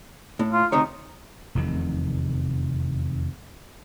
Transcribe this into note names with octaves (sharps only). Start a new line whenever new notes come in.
A2
F4
D2 C3 D#4 C#5
F1 E2 C3 D#3